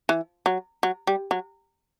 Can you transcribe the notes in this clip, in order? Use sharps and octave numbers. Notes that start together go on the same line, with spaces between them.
E3
F#3
F#3
G3
F#3